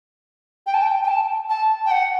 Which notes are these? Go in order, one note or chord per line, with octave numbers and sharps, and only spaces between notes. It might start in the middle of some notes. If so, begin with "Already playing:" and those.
G5
A5
G5
G5
A5
A5
G5
F#5